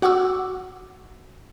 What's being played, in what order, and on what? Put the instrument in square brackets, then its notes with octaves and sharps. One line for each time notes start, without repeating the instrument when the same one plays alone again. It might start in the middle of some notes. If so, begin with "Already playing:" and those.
[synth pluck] F#4 F#5 C#6 D6 E6